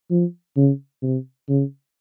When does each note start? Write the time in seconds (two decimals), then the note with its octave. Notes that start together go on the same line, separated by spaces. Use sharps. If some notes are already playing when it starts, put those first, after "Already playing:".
0.11 F3
0.57 C#3
1.03 C3
1.49 C#3